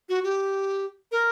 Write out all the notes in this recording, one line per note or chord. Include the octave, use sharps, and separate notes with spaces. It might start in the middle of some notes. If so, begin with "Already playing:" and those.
F#4
G4
A#4